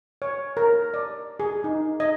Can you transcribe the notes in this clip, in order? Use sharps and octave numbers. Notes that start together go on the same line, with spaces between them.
C#5
A#4
D5
G#4
D#4
D#5